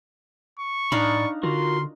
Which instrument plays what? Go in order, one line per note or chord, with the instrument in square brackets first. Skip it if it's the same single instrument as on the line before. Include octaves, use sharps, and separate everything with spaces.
[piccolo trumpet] C#6
[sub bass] A2 [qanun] D4 D#4 F5 [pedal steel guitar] D5 B5
[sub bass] D3 [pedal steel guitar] F4 F#4 A#4 [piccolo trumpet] C6